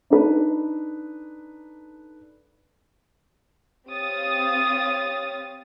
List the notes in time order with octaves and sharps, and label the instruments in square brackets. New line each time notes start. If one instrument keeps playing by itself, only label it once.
[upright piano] D4 D#4 A4 B4
[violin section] C4 G4 C#5 F5 D#6 A6